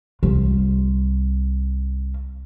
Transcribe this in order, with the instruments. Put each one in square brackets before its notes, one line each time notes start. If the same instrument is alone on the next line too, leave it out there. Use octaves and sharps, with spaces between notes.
[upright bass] C2 F4